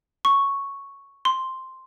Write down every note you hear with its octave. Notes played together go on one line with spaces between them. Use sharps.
C#6
C6